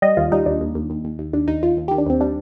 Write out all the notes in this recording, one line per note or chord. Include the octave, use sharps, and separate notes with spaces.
G3 D#5
D#2 F4
G3 D#4
D#2 D4
D#2
D#2
D#2
D#2
D#2
D#2 D4
D#2 D#4
D#2 F4
D#2
D#3 G4
D4
D#2 C4
G3 D4